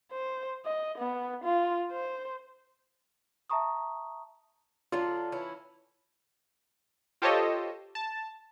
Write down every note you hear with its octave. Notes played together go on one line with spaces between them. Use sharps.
C5
D#5
B3
F4
C5
E5 A5 A#5 C#6 D#6
D3 F#3 D4 F4
E3 C#4 E4
F4 G4 A4 C5 C#5 D#5
A5